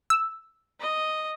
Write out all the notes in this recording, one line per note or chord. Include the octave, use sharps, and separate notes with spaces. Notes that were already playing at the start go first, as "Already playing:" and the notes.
E6
D#5